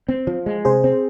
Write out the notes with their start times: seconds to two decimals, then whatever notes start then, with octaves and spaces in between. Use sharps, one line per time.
0.08 C4
0.27 F3
0.46 G#3
0.65 C3 G#4 C5
0.84 C4